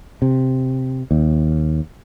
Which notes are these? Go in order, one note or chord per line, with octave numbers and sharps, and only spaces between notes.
C3
D#2